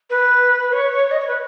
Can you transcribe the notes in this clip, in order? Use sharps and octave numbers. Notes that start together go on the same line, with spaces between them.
B4
C#5
D#5
C#5
B4